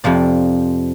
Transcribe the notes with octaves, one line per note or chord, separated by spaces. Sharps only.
F2 C3 F3 D5